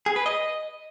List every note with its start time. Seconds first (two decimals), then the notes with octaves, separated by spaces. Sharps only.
0.06 G#4
0.16 B4
0.26 D#5